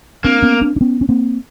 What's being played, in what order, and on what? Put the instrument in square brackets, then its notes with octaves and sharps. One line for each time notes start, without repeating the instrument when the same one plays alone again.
[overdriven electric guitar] A#3 [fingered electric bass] C4 D4
[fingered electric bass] B3 C#4
C4 D4
D4
B3 C#4
C#4
A#3 C4